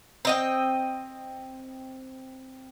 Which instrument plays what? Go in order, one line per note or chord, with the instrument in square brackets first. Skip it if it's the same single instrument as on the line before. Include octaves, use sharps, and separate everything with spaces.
[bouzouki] C4 D#5 G5